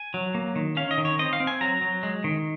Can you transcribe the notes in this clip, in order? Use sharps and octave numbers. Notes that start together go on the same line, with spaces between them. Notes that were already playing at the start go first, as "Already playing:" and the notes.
Already playing: G#5
F#3
A#3
D#3
C#4 F5
D#5
D#3
C#5
C4 D#5
F5
C4
G#5
F#3 A#5
F#3
G#3
D#3